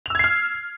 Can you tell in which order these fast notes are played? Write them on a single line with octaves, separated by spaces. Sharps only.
F7 E6 G#6 C7 F6